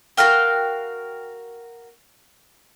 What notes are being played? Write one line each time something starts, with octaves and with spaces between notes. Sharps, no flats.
F#4 A#4 F5 G5